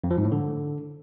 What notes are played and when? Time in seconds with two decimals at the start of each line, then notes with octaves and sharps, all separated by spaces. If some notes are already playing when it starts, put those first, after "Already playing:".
0.04 F2
0.11 F3
0.18 G#2
0.25 A2
0.32 D3